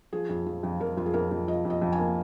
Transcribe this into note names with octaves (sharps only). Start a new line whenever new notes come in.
F3 G#4
F2
F3
F2
F2 A#4
F2 F4
G#4
F2 A#4
F2
F3 D#5
F2
D#5
F2
G#5
A#3